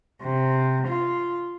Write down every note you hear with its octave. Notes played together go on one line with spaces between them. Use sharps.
C3
F4